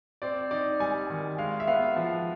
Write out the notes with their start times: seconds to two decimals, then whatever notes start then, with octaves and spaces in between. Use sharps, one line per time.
0.22 C4 D5
0.51 D#4 D5
0.80 G3 G#5
1.10 D#3
1.38 G#3 F5
1.60 E5
1.67 B3 F5
1.96 F3